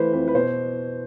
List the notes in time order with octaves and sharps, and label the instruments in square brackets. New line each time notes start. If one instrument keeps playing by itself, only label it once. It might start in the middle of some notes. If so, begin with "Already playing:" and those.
Already playing: [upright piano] E3 A3 B4 C5
F2 B4
B4
B2 C5